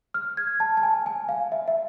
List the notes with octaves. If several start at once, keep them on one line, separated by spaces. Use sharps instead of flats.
F6
G#6
A5
A5
G#5
G#5
F5
E5
E5